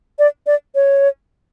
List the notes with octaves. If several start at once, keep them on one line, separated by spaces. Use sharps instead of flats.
D5
D5
C#5